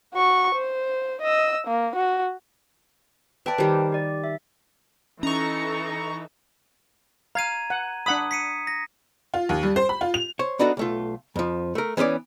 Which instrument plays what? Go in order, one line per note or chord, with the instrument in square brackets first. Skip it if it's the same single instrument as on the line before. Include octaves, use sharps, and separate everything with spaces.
[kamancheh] F#4 C#6
C5
D#5 E6
A#3
F#4
[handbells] B4 G5 A5 [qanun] D5 E5
[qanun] D#3 G3 [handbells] G4 A#4 C5
[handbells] G4 D5
E5
[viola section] E3 D#4 A4 [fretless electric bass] C#4 [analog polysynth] A#5 C#6
[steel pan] F5 [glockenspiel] A#5 G#6 D#7
[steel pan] F#5
[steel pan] D4 F#5 B5 [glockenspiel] D#6
[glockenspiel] B6 C#7 D#7
A#6
[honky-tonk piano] F4
D#2
G3
C5
B5
F4
F7
[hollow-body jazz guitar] C5 C#5
B3 D4 D#4 F#4 A4
B1 A3 F4
F2 F3
A3 A#4
E3 B3 C#4 B4 D5